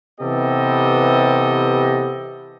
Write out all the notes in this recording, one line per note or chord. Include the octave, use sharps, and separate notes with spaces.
C3 E3 B3 G4 A4 D#5